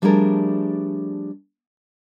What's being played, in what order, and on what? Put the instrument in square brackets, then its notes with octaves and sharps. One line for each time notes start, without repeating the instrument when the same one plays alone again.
[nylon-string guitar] F3 G3 A3 D4 G#4 A#4